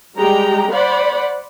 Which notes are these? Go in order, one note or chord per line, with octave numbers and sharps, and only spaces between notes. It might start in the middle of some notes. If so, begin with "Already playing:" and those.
G3 G#3 G4 G5 A#5
C5 D5 F#5 B5